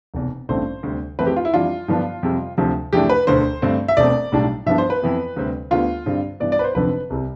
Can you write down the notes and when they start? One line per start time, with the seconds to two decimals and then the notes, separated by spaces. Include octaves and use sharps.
0.14 F1 E2 B2
0.49 A1 G2 D3 A3 C4 C5
0.83 D2 C3 G3
1.19 F2 E3 A3 C4 B4
1.27 G4
1.36 F4
1.45 E4
1.54 F2 E3 G3 D4 F4
1.88 G2 D3 F3 B3 D4
2.23 F2 C3 G3
2.58 D2 C3 F3
2.93 F2 C3 E3 A3 D4 G4
3.09 B4
3.27 E1 D2 D3 C5
3.62 G2 D3 A3 C4
3.88 E5
3.97 E1 E2 B2 A3 C4 D5
4.32 B1 A2 G3 D4
4.66 G2 F3 B3 D4 E5
4.78 C5
4.90 B4
5.02 F2 E3 B3
5.36 D2 C3 G3 C4
5.71 D2 D3 G3 B3 F4
6.06 G2 D3 G3 C4
6.40 G2 E3 B3 D5
6.52 D5
6.59 B4
6.64 C5
6.75 F1 F2 D3 F3 B4
7.10 C2 C3 G3